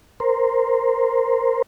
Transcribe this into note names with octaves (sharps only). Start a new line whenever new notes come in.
A#4 C5